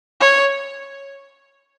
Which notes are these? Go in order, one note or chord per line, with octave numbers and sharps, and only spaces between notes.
C#5